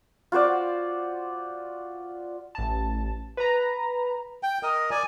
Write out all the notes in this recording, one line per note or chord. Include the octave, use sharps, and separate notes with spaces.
F4 F#4 C5 D5
A1 A5
B4 A#5
G5
A#4 D#5 D#6
D5 G#5